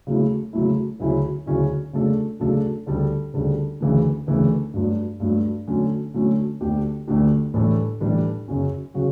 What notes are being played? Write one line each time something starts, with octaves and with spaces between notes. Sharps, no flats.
C#3 F#3 A3 E4
C#3 F#3 A3 E4
D2 C#3 F#3 C#4 E4
D2 C#3 F#3 C#4 E4
C#3 F#3 A3 D4 A4
C#3 F#3 A3 D4 A4
D2 C#3 G3 D4 A4
D2 C#3 G3 D4 A4
D2 C#3 E3 A3 D4
D2 C#3 E3 A3 D4
G2 F#3 A3 D4
G2 F#3 A3 D4
D3 F#3 A3 C#4
D3 F#3 A3 C#4
D2 D3 A3 D4 G4
D2 D3 A3 D4 G4
A2 E3 G3 D4 A4
A2 E3 G3 D4 A4
F#2 C#3 F#3 C#4 F#4
C#3 F#3 C#4 F#4